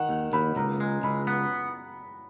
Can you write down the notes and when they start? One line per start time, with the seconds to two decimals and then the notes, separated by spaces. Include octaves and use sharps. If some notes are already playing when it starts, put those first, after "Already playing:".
Already playing: D#3 F#5
0.09 D#2
0.33 D#2 B5
0.56 C#2 A#5
0.80 G#3
1.03 C#2 B5
1.27 B3